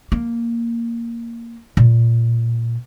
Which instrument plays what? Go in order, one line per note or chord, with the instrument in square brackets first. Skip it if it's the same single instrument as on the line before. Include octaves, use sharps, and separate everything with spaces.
[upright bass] A#3
A#2